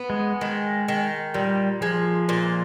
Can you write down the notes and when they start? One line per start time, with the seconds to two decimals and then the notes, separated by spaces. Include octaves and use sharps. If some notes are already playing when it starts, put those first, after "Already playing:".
Already playing: B3
0.10 G#3
0.41 D#3 G#3
0.88 D#3
1.34 A#2 G3
1.81 F3 G#3
2.29 A#2